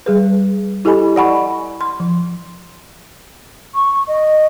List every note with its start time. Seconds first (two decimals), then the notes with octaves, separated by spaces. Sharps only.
0.06 G3 G#4 B4
0.85 E4 G4 A4 D#5 G#5 B5
1.16 D5 D#5 F#5 G#5 B5 C#6
1.81 C6
2.00 F3
3.75 C#6
4.08 D#5